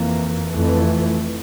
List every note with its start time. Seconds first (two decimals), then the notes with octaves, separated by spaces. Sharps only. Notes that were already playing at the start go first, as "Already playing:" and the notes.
Already playing: F2 E3 A#3
0.52 F2 E3 A3